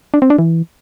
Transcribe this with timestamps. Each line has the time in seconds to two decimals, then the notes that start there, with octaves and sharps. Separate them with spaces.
0.14 D4
0.22 C4
0.30 D4
0.39 E3